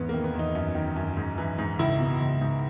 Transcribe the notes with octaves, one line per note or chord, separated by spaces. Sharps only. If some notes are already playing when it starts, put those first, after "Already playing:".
Already playing: E2 G#2 B3
D#3 A#3
B3
E2
D#4
F#2
D#3
F#2
G#2
E3
G#2
C#2 E4
B2
C#2
G#2